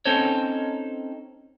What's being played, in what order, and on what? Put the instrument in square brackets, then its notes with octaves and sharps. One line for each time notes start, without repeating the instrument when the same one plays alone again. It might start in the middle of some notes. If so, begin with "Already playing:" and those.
[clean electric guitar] C4 C#4 D#4 A4 C5 C#5